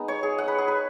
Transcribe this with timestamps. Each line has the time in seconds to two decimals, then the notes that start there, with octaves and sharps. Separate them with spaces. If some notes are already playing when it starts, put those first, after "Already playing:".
Already playing: G#3 B3 D#4
0.08 C#5
0.23 G#4
0.38 F#5
0.48 B4
0.58 G#4
0.68 B4